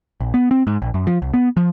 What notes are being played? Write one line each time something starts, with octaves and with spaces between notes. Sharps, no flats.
A#1
B3
C4
G#2
A#1
F#2
F3
C2
B3
F3